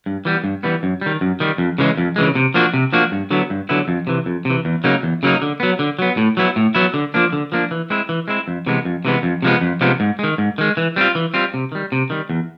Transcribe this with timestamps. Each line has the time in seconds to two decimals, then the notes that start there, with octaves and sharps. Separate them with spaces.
0.06 G2
0.25 E3 G3 B3
0.44 G2
0.63 E3 G3 B3
0.83 F#2
1.01 D#3 G3
1.21 F#2
1.40 D#3 G3
1.58 F2
1.78 C#3 E3 G#3
1.97 F2
2.16 C#3 E3 G#3
2.35 C3
2.54 F3 A#3 D4 F#4
2.74 C3
2.93 F3 A#3 D4 F#4
3.12 G2
3.31 D3 F#3 B3 E4
3.50 G2
3.69 D3 F#3 B3 E4
3.88 F2
4.07 C3 E3
4.26 F2
4.45 C3 E3
4.65 E2
4.84 C#3 F#3 A#3 D#4
5.03 E2
5.23 C#3 F#3 A#3 D#4
5.42 D3
5.60 F#3 B3
5.79 D3
5.99 F#3 B3
6.17 A2
6.37 F#3 B3 E4
6.56 A2
6.75 F#3 B3 E4
6.94 D3
7.14 F3 A#3 D4
7.33 D3
7.52 F3 A#3 D4
7.71 E3
7.90 G#3 C4 E4
8.09 E3
8.28 G#3 C4 E4
8.48 F2
8.66 C3 E3 G#3 B3
8.85 F2
9.05 C3 E3 G#3 B3
9.23 F2
9.42 C3 F3 G#3 B3
9.61 F2
9.81 C3 F3 G#3 B3
10.00 G#2
10.19 D#3 G#3
10.38 G#2
10.58 D#3 G#3
10.77 E3
10.96 G3 C4 F4
11.15 E3
11.34 G3 C4 F4
11.54 C3
11.72 D#3 G3
11.92 C3
12.10 D#3 G3
12.30 E2